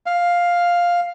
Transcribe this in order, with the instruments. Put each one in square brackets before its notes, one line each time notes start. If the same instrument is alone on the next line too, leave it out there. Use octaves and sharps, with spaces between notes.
[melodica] F5